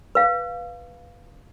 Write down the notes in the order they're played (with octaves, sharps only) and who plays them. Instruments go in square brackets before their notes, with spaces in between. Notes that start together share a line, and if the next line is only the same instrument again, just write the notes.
[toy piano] B4 F5